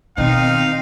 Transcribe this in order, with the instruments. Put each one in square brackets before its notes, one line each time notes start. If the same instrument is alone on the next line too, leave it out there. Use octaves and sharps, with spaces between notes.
[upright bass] B2 D#3 [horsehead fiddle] C4 [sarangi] D#4 [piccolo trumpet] F5